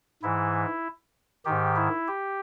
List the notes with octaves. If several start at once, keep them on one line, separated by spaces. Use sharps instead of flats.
G#2 E3 E4
G#2 D#3 G4
E4
G4